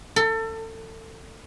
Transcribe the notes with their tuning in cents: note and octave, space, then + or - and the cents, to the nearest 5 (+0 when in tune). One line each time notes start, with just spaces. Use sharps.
A4 +30